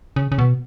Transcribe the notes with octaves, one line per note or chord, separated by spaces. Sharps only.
C#3
C#3
B2